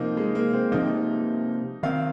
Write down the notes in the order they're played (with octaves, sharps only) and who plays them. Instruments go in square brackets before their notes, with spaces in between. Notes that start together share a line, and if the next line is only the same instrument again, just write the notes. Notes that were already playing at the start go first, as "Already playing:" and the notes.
Already playing: [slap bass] C3 F3 C4 [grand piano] A#3 D#4 F4
[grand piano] G#3
A#3
C4
[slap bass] C3 F3 A#3 [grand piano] D#4
[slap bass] D#3 C4 [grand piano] F5